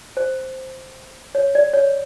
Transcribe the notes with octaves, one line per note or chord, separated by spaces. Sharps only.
C5
C#5
D5
C#5